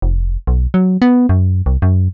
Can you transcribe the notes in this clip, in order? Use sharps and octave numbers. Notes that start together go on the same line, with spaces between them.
F1
B1
F#3
B3
F#2
C2
F#2